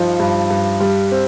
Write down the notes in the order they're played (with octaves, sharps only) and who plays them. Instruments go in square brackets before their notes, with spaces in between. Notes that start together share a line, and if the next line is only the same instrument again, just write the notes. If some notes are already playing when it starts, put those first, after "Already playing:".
Already playing: [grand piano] G2 F3 D#4
G2
G2
G3
C4